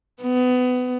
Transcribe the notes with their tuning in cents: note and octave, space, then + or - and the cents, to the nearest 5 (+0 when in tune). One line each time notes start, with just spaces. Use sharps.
B3 +25